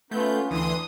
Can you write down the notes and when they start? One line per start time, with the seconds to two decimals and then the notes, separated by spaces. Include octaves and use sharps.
0.11 A3 B3 C#4 F4 G6
0.51 D2 E3 D4 C6 D#6